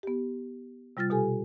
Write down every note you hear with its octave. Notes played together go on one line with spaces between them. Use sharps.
B3 G4
C3 G3 F4 F6 A6
B2 G4 A4 G#5